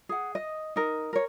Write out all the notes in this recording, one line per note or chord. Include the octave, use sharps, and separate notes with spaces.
G#4 F#5
D#5
D#4 A#4
A#4 C#5